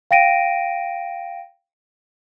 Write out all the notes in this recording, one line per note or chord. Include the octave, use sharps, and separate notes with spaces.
F5 G5 A#6 D7 D#7